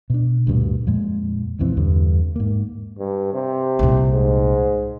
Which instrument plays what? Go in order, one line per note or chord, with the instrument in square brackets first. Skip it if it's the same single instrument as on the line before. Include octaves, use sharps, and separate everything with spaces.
[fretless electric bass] B2 D4
D2 G2 A#2
F2 A#2 G#3
B1 F2 E3 C4
E2 G2 D3
G#2 A#3
[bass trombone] G2
C3
[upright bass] C2 A#2
[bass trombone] G#2